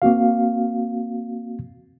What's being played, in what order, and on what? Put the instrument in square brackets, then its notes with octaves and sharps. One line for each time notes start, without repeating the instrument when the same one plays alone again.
[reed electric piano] A#3 C4 F#4 F5